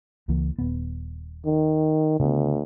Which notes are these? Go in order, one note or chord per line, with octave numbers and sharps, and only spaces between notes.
C#2 E3 A#3
D#1 B3
D#3
D2 C#3 B3